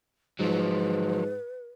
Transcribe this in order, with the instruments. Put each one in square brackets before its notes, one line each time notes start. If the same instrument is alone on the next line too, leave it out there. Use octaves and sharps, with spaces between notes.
[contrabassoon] G#2 [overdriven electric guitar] F3 F#3 [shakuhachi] B4